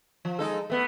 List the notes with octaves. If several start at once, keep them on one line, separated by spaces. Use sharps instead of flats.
F3
G#3 D#4 A4
A3 B3